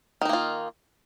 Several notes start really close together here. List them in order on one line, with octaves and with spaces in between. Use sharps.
D#3 D#4 A#3 F4